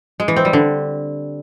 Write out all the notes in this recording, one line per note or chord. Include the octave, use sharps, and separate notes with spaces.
G#3
E3
C4
G3
D3